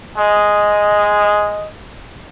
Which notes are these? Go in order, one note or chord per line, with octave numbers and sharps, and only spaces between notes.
G#3 D#5